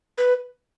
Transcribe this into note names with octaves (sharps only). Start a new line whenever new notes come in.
B4